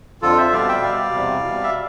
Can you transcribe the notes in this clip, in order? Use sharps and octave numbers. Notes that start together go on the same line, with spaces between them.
F2 D3 F3 F4 A4
C5 E5
B2 G3 D5 F5
E5 G5
B2 G3 D5 F5
E2 C3 G3
B2 G3
E5